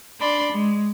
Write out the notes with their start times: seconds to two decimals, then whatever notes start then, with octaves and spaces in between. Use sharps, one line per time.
0.20 D4 D5 B5 C6
0.52 G#3